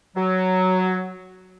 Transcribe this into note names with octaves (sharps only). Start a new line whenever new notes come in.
F#3